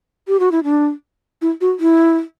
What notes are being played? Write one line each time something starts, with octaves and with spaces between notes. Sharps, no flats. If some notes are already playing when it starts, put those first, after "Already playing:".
G4
F#4
E4
D4
E4
F#4
E4